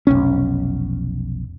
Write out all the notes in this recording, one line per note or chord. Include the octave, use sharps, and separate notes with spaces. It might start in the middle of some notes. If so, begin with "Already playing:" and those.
F1 B1 C#4